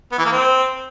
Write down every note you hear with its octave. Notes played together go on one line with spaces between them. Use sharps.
B3
E3
A#3
C4